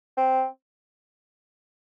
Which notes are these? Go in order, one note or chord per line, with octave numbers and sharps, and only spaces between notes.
C4